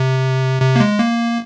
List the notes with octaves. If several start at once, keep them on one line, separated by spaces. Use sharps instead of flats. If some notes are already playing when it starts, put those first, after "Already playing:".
Already playing: C3
C3
A#3
G#3
A#3